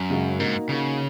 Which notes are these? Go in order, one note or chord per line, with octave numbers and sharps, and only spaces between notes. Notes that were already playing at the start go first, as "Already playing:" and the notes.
Already playing: F#2
C#3 G#3 C#4 F#4
G#2 A#3 D#4 F#4 A#4
C#3 A#3 D#4 F#4 A#4